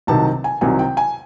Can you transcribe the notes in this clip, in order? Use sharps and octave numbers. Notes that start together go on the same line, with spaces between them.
C2 C3 D#3 F#3 A5
G#5
C2 C3 D#3 F#3 G#5
G5
G#5